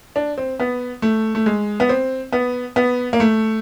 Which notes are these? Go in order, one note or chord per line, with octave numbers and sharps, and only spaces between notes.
D4
C4
B3
A3
A3
G#3
B3
C4
B3
B3
A#3
A3